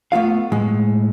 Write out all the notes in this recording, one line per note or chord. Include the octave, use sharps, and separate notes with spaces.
A3 B3 F4 F5
A2 G#3